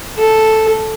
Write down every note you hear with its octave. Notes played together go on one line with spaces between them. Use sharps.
A4